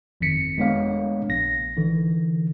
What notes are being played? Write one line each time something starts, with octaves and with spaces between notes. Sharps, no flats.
G1 F2 D#3 B6 C#7
G#3 A3 B3 D4 C#5 F5
A#1 A#6
D3 E3